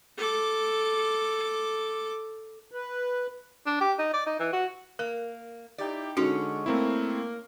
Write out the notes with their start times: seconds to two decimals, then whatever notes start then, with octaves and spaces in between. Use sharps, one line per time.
0.17 A4 D6
2.71 B4
3.66 D4
3.80 G4
3.99 D#4
4.14 D5
4.26 D#4
4.39 E3
4.53 F#4
4.99 A#3 A#4
5.78 D#4 E4 G4 D5
6.17 D3 G#3 C#4 D#4 F#4 C#5
6.66 A3 A#3 C4 E4